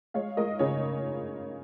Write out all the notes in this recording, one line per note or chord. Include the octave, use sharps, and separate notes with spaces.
G#3 C#5 F5
G#3 A#4 D#5
C#3 G#4 C#5